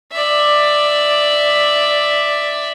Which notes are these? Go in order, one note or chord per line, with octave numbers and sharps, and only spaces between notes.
D5 E5